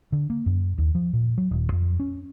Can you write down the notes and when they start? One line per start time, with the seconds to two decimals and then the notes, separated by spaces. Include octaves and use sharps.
0.12 D3
0.30 A#3
0.46 F#2
0.78 D#2
0.95 F3
1.13 A#2
1.38 F#3
1.51 D#1
1.72 F2
2.00 C#4